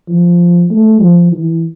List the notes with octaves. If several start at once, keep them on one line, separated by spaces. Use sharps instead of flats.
F3
A3
F3
E3